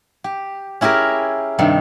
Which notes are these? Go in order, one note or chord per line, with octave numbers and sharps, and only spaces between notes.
G4
C#4 E4 G4 G#4 A#4
G2 C3 D#3